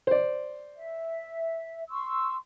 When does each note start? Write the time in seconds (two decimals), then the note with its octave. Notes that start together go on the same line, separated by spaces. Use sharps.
0.07 C5 D5
0.76 E5
1.90 C6 C#6 E6